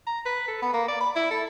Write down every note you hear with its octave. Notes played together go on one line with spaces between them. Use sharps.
A#5
B4
A4
B3
A#3
D5
B5
E4
A4